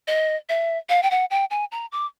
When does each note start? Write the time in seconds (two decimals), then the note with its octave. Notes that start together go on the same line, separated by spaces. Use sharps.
0.07 D#5
0.49 E5
0.89 F5
1.03 G5
1.11 F#5
1.31 G5
1.50 G#5
1.72 A#5
1.92 D6